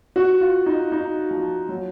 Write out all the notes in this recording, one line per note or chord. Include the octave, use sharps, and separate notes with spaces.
F#4
F4
D#4
D#4
F3
F#3